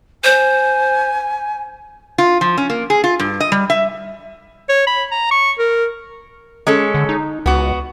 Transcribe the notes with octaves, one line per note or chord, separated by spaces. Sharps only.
C5 G#5
F4
F3
C#4
A#3
G#4
F4
G2
D#5
G3
E5
C#5
B5
A#5
C#6
A#4
G#3 C#4 A4
D3
D#4
C#2 B3 F#4